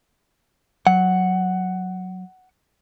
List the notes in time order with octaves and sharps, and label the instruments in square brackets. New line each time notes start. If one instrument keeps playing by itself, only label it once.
[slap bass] F#3 [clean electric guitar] F#5